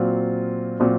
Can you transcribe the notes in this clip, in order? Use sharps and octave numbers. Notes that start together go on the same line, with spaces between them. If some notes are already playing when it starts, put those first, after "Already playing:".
Already playing: A#2 F#3 C4 F4
A#2 F#3 C4 F4